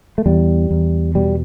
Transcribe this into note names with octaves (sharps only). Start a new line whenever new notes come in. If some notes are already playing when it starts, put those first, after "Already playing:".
A3
E2 G3
E2
B2 G3